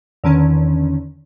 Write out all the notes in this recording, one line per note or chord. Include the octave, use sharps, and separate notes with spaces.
E2 D3 D#3 C#4